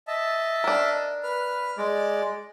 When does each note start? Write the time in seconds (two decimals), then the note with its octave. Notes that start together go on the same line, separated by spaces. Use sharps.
0.08 D#5 E5 A5
0.64 D4 A#4
1.23 B4 F6
1.78 G#3 D5